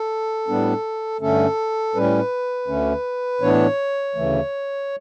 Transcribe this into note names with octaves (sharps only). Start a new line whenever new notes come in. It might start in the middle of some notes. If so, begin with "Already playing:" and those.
Already playing: A4
A2 G3 B3 D4
G2 D3 A3 C#4 A4
A2 G3 C#4 B4
D2 D3 A3 C#4
A2 E3 B3 D4 C#5
D2 C#3 E3 A3